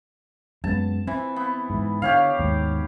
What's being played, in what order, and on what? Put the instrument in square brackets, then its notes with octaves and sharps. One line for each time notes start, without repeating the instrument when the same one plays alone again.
[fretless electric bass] F#2 G#3 B3 [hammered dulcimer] A5
[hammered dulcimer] E3 [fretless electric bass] C4
[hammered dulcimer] B3
[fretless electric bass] G#2 E3
[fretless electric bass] D3 [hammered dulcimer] G4 C#5 F5
[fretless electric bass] D#2 G#2